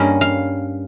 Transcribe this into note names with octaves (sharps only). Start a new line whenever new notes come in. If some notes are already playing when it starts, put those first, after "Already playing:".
Already playing: G2 G3 A#3 C#4
F5